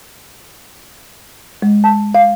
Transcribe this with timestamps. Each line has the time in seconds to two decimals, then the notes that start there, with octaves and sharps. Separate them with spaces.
1.62 G#3
1.84 A5
2.15 F5